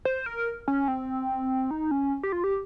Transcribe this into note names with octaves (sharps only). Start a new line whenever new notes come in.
C5
A#4
C#4
C4
D#4
C#4
G4
F4
G4